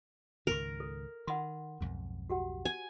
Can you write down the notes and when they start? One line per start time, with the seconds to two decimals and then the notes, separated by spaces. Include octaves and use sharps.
0.47 C#2 G#2 D#3 A#4
0.80 A4
1.27 D#3 F#5 B5 C6
1.81 B1 F2 G#2
2.29 F#4 G4 F#5
2.65 G#5